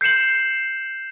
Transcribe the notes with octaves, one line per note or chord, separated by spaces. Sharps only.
G6 C7 C#7 E7 F#7